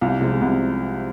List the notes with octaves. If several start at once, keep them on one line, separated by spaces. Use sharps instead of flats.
C2 F4
C3 F3 G#3
C2